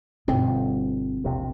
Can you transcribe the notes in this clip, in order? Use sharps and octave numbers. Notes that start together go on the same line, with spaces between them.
G1 B2 C4
E1 A#1 C3